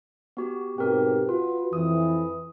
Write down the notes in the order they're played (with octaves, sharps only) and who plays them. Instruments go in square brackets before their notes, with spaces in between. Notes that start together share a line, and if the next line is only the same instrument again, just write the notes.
[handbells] B3 F#4 G4
[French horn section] G#2 B2 G4 [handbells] C4 A#4
[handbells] F4 [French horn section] F#4 B4
[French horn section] F2 E3 [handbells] D#6